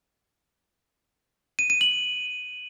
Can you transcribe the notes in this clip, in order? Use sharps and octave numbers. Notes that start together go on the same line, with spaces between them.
D#7
D#7
F#7